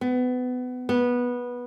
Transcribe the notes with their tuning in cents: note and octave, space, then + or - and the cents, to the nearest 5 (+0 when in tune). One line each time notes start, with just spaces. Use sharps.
B3 +25
B3 -15